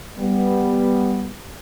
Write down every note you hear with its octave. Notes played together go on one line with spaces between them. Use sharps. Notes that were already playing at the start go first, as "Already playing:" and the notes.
G3 B3